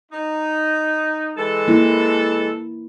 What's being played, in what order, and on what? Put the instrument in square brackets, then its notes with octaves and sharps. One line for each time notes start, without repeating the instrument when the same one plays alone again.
[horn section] D#4
E3 G#3 A4
[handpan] A#3 E4